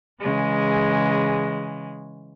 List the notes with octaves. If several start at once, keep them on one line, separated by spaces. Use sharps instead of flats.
C#3 E3 G#3